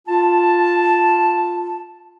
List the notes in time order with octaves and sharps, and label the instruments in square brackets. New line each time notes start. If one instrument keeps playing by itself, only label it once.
[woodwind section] F4 A5